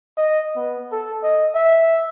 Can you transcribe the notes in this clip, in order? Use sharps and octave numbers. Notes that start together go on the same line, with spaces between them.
D#5
B3
A4
D#5
E5